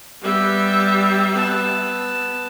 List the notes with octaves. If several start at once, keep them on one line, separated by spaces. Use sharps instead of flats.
G3 B3 G4 E5
B3 A5